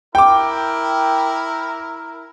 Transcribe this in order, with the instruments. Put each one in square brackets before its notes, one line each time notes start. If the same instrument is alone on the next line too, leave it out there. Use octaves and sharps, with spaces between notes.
[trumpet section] E4 A#4 [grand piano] G5 D6